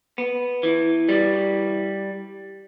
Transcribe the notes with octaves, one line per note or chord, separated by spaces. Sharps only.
B3
E3
G3